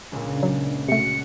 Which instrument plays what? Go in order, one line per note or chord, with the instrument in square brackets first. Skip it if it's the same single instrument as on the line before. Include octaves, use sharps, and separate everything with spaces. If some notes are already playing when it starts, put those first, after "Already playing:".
[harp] C#2 A#2 [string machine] C#3 D4
[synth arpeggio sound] F#3
[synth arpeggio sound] C3 A3 [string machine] F#4 F#5 F#6 [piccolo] C#7